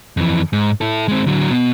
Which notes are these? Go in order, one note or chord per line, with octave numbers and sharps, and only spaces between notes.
F2 E3
G#2
E4 A4
G#3 C4
D3 F#3
B2